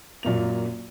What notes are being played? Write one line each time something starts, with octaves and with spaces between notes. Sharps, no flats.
F#2 A#2 A#3 F7